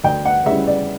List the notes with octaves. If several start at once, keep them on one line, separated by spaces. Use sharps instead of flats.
D2 G5
F#5
C#3 G3 C#4 E4 E5
D5